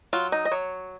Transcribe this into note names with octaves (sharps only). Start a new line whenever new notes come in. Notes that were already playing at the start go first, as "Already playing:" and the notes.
F#3 F4
D#4
D#5
F#3 C#5